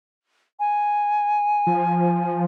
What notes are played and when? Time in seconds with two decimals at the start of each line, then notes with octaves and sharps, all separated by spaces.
0.60 G#5
1.67 F3